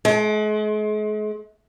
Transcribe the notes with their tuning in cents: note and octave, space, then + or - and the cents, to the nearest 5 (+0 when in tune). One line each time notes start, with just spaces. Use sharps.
G#3 +40